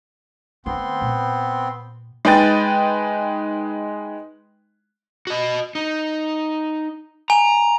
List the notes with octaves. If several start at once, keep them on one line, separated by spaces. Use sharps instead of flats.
D3 A3 B3 C4 C6
A#2
G#3 D#4 B4 G5 A6
F#4 D#5
D#4
G#5 A#5